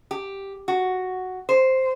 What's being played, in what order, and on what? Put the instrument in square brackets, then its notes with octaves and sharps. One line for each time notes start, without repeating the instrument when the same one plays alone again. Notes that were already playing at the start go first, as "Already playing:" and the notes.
[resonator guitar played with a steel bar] G4
F#4
C5